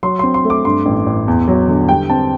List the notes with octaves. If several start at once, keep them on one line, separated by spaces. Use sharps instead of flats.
F#3 C6
C4 C6
C6
A3
D6
G2 C6
A1
A1
E2
F#3
D3
G3 G5
C4 A5